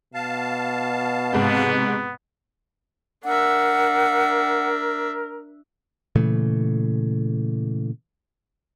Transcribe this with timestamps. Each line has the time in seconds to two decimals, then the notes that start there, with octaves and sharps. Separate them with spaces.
0.14 B2 F5 A5
1.33 G#2 C3 B3
3.24 D4 A#4 E5 F#5
6.16 A#2 C#3 E3 A3